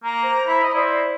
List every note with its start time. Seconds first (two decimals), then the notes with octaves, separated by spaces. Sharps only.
0.04 A#3 A#5
0.23 C5
0.47 E4 B5
0.63 D#5
0.74 E4 C5 D5